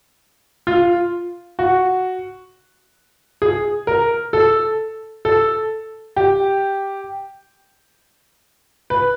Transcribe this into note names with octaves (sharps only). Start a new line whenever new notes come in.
F4
F#4
G#4
A#4
A4
A4
G4
B4